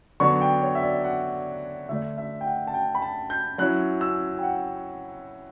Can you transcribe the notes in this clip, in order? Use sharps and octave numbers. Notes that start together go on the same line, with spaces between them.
D3 F#3 B3 D4 C#6
G5
C#5
E5
D5
F#5
D3 A3 D4 E5
E5
G5
F#5
A5
G5
B5
A5
G6
F#3 C#4 E4 F#6
E6
G5
F#5